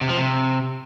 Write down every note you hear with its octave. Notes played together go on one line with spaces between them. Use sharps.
C3
F3
C3